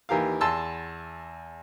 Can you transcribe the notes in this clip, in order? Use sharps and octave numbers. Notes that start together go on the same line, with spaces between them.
D#2 E3 G4 A#4 F5
E2 A5 C6 E6